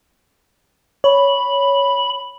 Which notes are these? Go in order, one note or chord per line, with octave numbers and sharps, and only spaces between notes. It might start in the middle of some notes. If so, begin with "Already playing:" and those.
C#5 B5